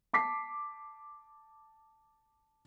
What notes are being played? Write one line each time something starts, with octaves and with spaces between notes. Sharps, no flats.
A5 D6 B6 C7